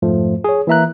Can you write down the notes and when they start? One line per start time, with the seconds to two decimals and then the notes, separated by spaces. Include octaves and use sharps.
0.02 F2 G#2 F3 A3
0.44 G#4 C#5
0.67 E3 A#3 E5 A#5 F#6